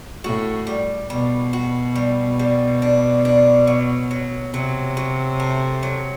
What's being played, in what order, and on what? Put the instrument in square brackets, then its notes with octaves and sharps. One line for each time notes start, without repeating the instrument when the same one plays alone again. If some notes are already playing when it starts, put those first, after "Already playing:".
[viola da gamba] A2 [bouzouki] F#4
[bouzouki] G3
[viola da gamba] B2 [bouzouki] G3
[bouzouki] F#4
G3
G3
D4
D4
F#3
F#3
[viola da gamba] C3 [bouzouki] F#3
[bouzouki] F#3
A3
F#3